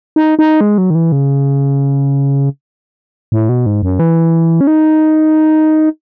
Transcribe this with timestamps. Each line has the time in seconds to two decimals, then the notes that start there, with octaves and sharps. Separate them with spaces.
0.16 D#4
0.39 D#4
0.61 G#3
0.78 F#3
0.90 D#3
0.95 E3
1.12 C#3
3.32 A2
3.49 B2
3.66 G#2
3.83 F#2
3.99 E3
4.61 C#4
4.67 D#4